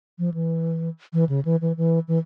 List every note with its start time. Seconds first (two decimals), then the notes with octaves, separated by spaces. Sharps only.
0.19 F3
0.34 E3
1.13 E3
1.29 C#3
1.45 E3
1.61 E3
1.77 E3
2.08 E3